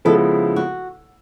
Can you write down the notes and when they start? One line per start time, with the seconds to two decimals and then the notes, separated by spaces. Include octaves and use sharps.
0.05 C#3 F3 G#3 B3 E4 A4
0.56 F#4